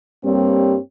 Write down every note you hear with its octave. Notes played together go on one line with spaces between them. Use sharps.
G2 G3 A#3 C4 G4 C#5